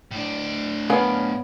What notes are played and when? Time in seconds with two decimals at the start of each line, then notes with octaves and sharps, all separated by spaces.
0.11 A2 D4
0.90 B3 C#4 A#4 F5